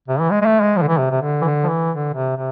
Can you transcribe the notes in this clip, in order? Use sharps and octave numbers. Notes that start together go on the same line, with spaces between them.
C3
E3
G#3
G#3
A3
G#3
F3
D3
E3
C3
C3
D3
E3
D3
F3
E3
D3
C3
C3